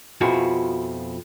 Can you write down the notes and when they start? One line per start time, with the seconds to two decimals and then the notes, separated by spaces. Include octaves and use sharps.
0.21 F2 B2 F3 E4 F#4 G#4